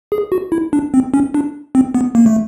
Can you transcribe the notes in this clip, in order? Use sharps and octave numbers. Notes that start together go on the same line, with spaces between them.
G#4
F#4
E4
D4
C4
C#4
D4
C4
B3
A#3
A3